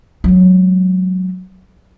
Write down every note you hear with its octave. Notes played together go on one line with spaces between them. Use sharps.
F#3 G#3